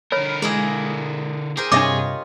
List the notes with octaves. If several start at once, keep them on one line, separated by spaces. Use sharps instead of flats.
D3 A#4 C#5 B5 F6
G#3 A#3 E4 G#4
G4 G#4 A#4 C5
G2 C3 D4 F4 C#5 D#5 E5 D6